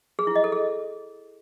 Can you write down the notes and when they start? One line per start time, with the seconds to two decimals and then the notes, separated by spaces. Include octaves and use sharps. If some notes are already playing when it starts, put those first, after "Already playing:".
0.19 G#4
0.27 E4
0.36 D#5
0.44 A4
0.52 G#4